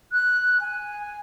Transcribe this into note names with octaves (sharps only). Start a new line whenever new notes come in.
F#6
G#5